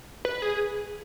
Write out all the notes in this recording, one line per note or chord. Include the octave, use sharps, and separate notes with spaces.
B4
G#4